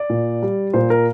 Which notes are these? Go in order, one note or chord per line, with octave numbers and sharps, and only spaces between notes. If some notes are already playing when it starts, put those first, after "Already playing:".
Already playing: D5
A#2
G3
A#2 C5
A#4